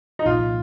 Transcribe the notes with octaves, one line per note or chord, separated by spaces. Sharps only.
D#4
C2 A#2 F3 A#3 F4